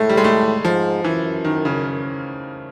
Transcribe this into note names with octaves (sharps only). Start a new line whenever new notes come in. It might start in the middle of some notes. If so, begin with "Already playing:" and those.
Already playing: A2 G#3 A3
G3
G#3
A3
G#2 F3
F#2 E3
D#3
C#3